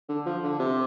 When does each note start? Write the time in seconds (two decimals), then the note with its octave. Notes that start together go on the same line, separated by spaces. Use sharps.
0.09 D3
0.26 F3
0.43 D3
0.59 C3